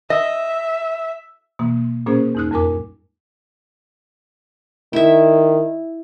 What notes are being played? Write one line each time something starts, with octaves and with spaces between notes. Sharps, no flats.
D#5 E5
B2 E3 A#3
A#2 A#3 C#4 G#4 C5
E2 G#2 D#4 F6 F#6
F2 G3 A#4 G#5 D6
D#3 E4 E5